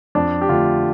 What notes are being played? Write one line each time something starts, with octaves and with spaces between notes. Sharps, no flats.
F2 D4
G4
D3 A3 F4